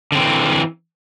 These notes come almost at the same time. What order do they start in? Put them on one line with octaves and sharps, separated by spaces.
D3 C4 E3